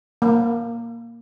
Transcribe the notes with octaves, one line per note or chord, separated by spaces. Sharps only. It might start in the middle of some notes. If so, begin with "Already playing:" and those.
A#3